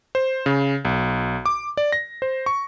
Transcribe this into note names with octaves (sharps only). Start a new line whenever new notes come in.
C5
C#3
B1
D6
D5
A#6
C5
C#6